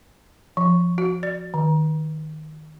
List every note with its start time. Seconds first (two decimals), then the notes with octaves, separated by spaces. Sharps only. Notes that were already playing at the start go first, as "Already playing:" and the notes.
0.57 F3
0.98 F#4
1.23 D5
1.54 D#3